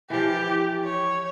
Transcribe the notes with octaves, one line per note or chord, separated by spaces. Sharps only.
E3 F3 G4
C#5